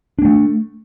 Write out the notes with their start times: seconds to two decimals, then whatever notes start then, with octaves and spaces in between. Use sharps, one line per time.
0.19 D4
0.22 A#3
0.25 A3